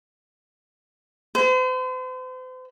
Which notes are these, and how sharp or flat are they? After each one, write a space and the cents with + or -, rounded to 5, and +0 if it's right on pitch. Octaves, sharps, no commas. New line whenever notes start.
C5 -40